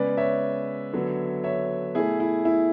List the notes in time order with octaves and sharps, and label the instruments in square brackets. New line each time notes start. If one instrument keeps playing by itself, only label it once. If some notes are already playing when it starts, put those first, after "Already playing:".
Already playing: [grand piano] C#3 G#3 B3 B4 D5
C#5 E5
D3 F#3 B3
C#5 E5
B2 A3 E4 G#4
E4
E4